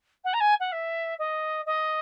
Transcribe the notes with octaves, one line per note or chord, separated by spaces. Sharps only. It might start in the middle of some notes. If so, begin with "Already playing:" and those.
F#5
A#5
G#5
F#5
E5
D#5
D#5